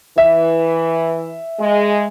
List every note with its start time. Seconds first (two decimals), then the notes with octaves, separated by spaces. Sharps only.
0.18 E3 E5
1.59 G#3